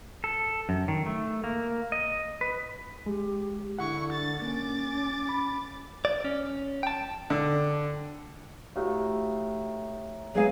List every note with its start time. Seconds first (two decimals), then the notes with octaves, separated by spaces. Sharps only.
0.24 A4
0.69 F#2
0.88 D#3
1.06 A3
1.44 A#3
1.92 D#5
2.41 B4
3.06 G#3 G4
3.79 D3 E4 F#5 C#6
4.13 A6
4.42 A#3 C#4 D6 A6
5.29 B5
6.05 D5
6.25 C#4
6.83 G5 A5
7.30 D3
8.76 A2 D#4 F#4 G4 F5
10.35 F#3 G#3 B3 G#4 F5